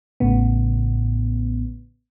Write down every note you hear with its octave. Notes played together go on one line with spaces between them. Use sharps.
A1 A2 C#3 B3